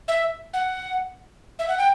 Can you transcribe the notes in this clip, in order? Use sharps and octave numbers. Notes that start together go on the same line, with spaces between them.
E5
F#5
E5
F#5
G5